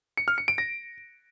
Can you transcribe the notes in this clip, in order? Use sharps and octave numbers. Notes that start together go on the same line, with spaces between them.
C#7
F6
C#7
D7
A#6